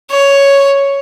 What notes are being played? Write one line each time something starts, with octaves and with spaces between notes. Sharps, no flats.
C#5